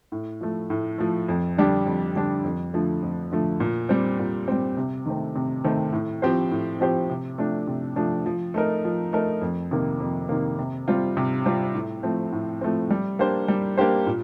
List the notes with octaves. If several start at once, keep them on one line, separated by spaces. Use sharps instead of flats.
A2
F3 A3
A2
F3 A3
F2
D3 G3 D4 G4
F2
D3 G3 D4 G4
F2
D3 F3 A3
F2
D3 F3 A3
A#2
G3 C4
A#2
G3 C4
C3
D#3 A3 C4
C3
D#3 A3 C4
A2
F3 C4 G4 C5
A2
F3 C4 G4 C5
C3
F3 A3 D4
C3
F3 A3 D4
F3
A3 D#4 A#4
F3
A3 D#4 A#4
F2
C3 D#3 A#3
F2
C3 D#3 A#3
C3
G3 C4 F4
C3
G3 C4 F4
A2
F3 A3 C4
A2
F3 A3 C4
G3
A#3 D4 G4 C5
G3
A#3 D4 G4 C5
A#2